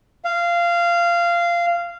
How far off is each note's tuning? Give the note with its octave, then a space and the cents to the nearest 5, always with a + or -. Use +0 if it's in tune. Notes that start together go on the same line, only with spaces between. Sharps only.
F5 -15